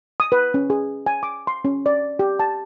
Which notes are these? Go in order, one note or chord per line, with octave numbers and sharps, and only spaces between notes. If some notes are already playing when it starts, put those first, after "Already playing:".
D#6
B4
C#4
G#4
G#5
D6
C6
C#4
D5
G4
A5